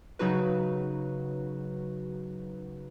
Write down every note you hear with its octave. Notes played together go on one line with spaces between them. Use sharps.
C#3 F#3 D#4 F#4 B4